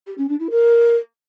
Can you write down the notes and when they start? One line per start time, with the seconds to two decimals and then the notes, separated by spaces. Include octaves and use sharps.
0.07 G4
0.17 C#4
0.28 D4
0.39 E4
0.50 A#4